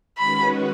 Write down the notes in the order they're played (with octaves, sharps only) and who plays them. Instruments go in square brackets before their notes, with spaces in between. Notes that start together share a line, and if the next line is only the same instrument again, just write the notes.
[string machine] D#3 G#3 C#4 F#4 B4 [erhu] B5